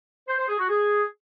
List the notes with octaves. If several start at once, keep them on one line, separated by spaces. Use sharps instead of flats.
C5
C5
G#4
F#4
G#4